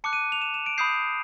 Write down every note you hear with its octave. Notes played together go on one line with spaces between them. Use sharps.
A5 D6 F#6 C#7
D#7
F7
E7
E7
D7
B5 D#6 G6 C7